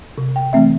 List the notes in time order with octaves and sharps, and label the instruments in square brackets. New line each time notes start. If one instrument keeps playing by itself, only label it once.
[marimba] C3
G5
E3 A3 C4 E5